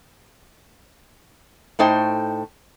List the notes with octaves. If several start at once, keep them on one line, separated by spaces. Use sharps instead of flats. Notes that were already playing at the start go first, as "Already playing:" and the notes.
A2 A3 D#4 C5 G5